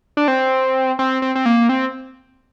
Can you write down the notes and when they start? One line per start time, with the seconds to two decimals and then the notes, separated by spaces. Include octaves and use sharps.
0.17 D4
0.28 C4
0.99 C4
1.22 C4
1.35 C4
1.46 A#3
1.69 C4